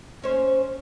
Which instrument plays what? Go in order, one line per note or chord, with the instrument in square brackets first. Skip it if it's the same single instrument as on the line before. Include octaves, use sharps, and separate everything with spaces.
[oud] D#2 C#4 C5